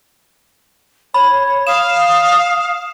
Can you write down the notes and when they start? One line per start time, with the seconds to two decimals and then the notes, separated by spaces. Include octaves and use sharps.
1.14 C#5 B5
1.67 F5 D#6 E7